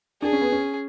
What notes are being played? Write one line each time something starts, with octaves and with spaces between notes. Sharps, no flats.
D4 G#4
C#4
B3
C#4